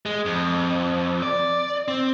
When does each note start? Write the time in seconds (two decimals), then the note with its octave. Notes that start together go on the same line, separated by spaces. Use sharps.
0.06 G#3
0.26 F2
1.22 D5
1.88 C4